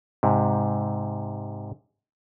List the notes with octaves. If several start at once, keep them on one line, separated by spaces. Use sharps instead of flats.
G#2 C3